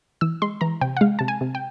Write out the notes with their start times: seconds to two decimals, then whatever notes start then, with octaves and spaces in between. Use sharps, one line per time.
0.21 E3 E6
0.42 G#3 C6
0.61 E3 A#5
0.81 C3 G5
0.97 F#5
1.01 G#3 F5
1.19 C3 A5
1.28 G#5
1.41 C3
1.55 G5